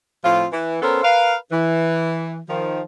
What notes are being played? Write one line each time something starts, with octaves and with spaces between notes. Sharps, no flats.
A2 F3 C4 F4
E3
B3 C#4 A4 A#4 C5
A#4 B4 F5
E3
D#3 F3